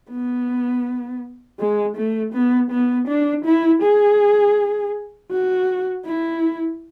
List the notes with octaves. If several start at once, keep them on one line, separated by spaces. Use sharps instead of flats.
B3
G#3
A3
B3
B3
D4
E4
G#4
F#4
E4